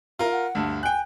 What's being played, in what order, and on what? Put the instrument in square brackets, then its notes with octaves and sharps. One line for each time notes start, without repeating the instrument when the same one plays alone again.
[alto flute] E4 [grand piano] F4 A#4
[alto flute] F#5
[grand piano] D2 G2
[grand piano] G5 F#6 [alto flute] G#5